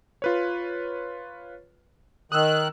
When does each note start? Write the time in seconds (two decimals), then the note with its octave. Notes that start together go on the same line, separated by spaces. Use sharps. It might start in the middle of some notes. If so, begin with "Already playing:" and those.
0.22 F4 B4 C#5
2.32 D#3 D#6 E6 F#6